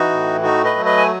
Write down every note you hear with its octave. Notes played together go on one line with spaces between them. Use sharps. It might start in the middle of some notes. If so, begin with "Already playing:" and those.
Already playing: E3 D#4 F#4
A2
A3 D#4 F#4
B4 D#5
F#3
B4 D#5
G#5